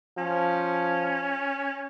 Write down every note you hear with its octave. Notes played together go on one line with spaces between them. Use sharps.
F3 C#4